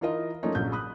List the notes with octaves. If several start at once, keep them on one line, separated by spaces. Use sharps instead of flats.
E3 D#4 F4 A#4 D#5
F3 A3 A#3 C#4 D#4
A#1 C#3 F#3 G6
B5 D#6 F#6